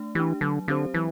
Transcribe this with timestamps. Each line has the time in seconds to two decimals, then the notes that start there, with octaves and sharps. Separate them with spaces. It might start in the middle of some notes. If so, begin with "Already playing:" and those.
Already playing: A3 D4
0.15 E3 D4 G4
0.41 D3 F#3
0.68 D3 C4 G4 C5
0.94 E3 F#3